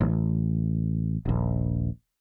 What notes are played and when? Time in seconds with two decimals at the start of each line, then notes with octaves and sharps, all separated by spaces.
0.01 A1
1.25 D#1 A#1